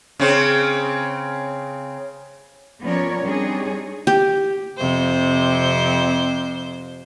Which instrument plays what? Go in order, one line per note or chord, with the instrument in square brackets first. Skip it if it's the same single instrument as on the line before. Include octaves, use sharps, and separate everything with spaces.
[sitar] C#3 C4
[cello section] F3 B3 C#4 A#4 C#5 D5
G3 C4 D4 D#4 G#4 C#5
[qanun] G4
[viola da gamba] F2 C3 C5